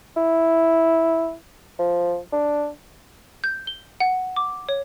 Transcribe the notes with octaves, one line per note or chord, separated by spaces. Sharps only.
E4
F3
D4
G6
G7
F#5
D6
C#5